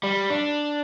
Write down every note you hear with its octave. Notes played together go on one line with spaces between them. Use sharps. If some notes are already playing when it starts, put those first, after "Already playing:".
G3
D4